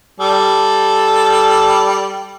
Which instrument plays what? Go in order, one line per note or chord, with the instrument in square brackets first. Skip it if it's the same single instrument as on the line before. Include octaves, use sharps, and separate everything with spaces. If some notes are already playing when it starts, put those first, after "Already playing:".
[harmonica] G3 A4